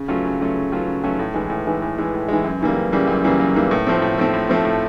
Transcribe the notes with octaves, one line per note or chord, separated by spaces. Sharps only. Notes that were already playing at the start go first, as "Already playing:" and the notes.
Already playing: C#3
F#3 A3 C#4 F4
C#3
F#3 A3 C#4 F4
C#3
F#3 A3 C#4 F4
C#3
F#3 A3 C#4 F4
A2
E3 G#3
A2
E3 G#3
A2
E3 G#3
A2
E3 G#3
F#2
C#3 E3 G3 A#3
F#2
C#3 E3 G3 A#3
F#2
C#3 E3 G3 A#3
F#2
C#3 E3 G3 A#3
A2
F3 A3 C4
A2
F3 A3 C4
A2
F3 A3 C4
A2